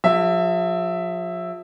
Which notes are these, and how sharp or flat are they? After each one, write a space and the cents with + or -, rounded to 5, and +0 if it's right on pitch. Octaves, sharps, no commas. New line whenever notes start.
F3 +40 G#4 -30 E5 +0